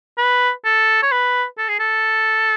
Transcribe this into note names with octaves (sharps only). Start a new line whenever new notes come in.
B4
A4
C#5
B4
A4
G#4
A4